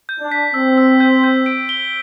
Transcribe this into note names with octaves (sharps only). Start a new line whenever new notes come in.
G6
D4
B6
C4 E6
E6
G6
G6
D7
G7